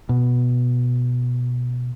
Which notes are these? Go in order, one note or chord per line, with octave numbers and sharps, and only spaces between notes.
B2